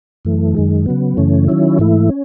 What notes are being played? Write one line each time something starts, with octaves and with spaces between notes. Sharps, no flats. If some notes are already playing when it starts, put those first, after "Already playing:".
F#2 E3 A3
F#2 D#3 G#3
C#3 F#3 B3
F#2 C#3 E3 A3 C#4
D#3 F#3 C#4 E4
G#2 E3 A3 E4
C#4